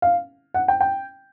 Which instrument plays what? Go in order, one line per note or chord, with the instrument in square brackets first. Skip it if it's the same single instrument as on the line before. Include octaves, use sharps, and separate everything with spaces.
[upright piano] F5
F#5
G5
G5